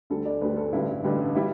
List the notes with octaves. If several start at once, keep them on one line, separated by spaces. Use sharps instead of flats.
D2 D3 G3 A4
D5
D2 D3 G3 B4
A4
A1 G2 D3 G3 E4
A1 G2 D3 G3
G3 E4